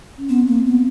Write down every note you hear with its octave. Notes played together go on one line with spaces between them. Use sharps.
C#4
B3 C4
A#3
B3